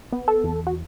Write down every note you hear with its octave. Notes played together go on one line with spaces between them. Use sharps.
B3
A4
E2
F#4